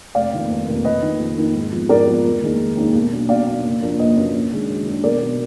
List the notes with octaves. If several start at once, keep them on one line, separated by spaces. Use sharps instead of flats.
F1 D5 F5
F2 D#3 A#3
F1
F2 D#3 A#3
F2 B4 D#5
D#3 A#3 D#4
F2
D#3 A#3 D#4
G#2
F3 B3
G#2 A#4 D5
F3 B3
F1
D#2 D#3 G#3 D#4
F1
D#2 D#3 G#3 D#4
B1
B2 F#3 A#3 D4
B1 D5 F5
B2 F#3 A#3 D4
F#1
F#2 F3 A#3 D4
F#1 B4 D#5
F#2 F3 A#3 D4
F#2
D#3 G#3 D4
F#2
D#3 G#3 D4
B1 A#4 D5
B2 F#3 B3